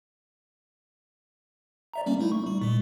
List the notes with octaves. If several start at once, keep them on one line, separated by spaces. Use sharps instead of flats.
D5 E5 A#5
G3 A#3 C#4
A3 D#4 E4
C#6
G3
A#2 G#3